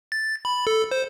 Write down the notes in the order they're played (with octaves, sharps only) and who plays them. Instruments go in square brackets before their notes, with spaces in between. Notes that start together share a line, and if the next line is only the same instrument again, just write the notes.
[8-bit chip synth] A6
B5
A4
C5